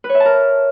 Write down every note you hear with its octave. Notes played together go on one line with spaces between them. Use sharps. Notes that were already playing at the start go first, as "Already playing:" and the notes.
B4
C#5
E5
A5
A#4